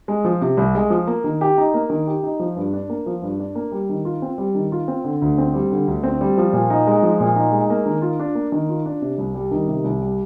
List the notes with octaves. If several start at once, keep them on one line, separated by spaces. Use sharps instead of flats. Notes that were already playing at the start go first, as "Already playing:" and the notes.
G#3
F3
C3
C2
G#3
F3
A#3
D#3
G4
D#4
A#3
D#3
G4
D#4
F3
G2
D4
A#3
F3
G2
D4
A#3
G3
D#3
F4
C4
G3
D#3
F4
C4
D3
D2
C4
G3
D3
D2
C4
G3
F3
A#2
D#4
G#3
F3
A#2
D#4
G#3
A#3
D#3
F4
D4
A#3
D#3
F4
D4
C3
C2
G3
D#3
C3
C2
G3